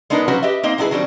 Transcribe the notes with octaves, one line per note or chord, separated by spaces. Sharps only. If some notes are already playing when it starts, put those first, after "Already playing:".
G#3 B3 D4 D#4 A#4 B4
F3 F#3 C#4 F#4 B4
G4 B4 D#5 E5
A#3 C4 D#4 D#5
F#3 B3 D4 E4 G#4 B4
D#3 F#3 G3 C4 D4